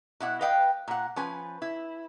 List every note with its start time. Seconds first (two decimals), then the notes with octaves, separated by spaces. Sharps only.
0.20 B2 E4 F#5
0.41 B4 D#5 F5 G5
0.88 A#2 F#5
1.16 F3 C#4 B4 G#5
1.62 E4